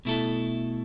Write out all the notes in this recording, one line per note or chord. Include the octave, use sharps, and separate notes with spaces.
B2 A3 E4 A4